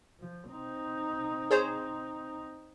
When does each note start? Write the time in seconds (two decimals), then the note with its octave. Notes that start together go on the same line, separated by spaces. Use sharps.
0.20 F3
0.51 C4 D#4
1.51 G#4 C5 C#5